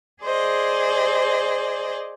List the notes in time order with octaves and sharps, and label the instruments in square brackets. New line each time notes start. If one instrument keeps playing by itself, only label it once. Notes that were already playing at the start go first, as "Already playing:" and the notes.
[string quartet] G#4 C5 D5 D#5